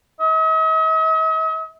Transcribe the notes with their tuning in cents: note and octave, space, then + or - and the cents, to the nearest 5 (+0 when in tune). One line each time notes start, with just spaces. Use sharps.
D#5 +45